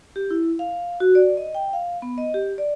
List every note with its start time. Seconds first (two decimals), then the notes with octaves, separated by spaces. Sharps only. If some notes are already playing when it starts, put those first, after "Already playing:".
0.16 G4
0.31 E4
0.59 F5
1.00 F#4
1.15 D5
1.37 D#5
1.55 G5
1.73 F5
2.02 B3
2.18 D#5
2.34 G4
2.58 D5